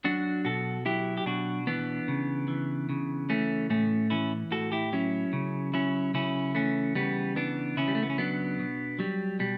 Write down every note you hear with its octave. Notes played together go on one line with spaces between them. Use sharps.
F#3 D4 F#4
B2 F#4 A4
F#3 E4 G4
G4
B2 D4 F#4
E3 B3 D4
C#3
E3
C#3
E3 A3 C#4
A2 A3 C#4
E3 C#4 E4
A2 F#4 A4
E4 G4
F#3 C#4 E4
C#3
F#3 C#4 E4
C#3 C#4 E4
E3 A3 C#4
C#3 G3 B3
E3 B3 D4
C#3 C#4 E4
G3
A3
B3
C#4
F#3 B3 D4
B2
F#3 G3
B2 G3